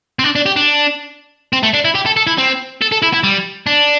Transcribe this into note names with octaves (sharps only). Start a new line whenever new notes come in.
C4
D4
D4
G4
D4
C4
A3
D4
E4
G4
A4
A4
E4
C4
A4
A4
E4
E4
G3
D4